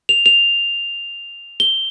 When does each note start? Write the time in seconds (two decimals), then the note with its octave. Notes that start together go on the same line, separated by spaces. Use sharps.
0.09 F7
0.26 F7
1.60 G7